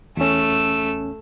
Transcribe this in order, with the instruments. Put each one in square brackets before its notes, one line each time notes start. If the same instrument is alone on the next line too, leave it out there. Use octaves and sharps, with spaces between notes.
[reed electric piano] E2 C#4 [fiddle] A3 E6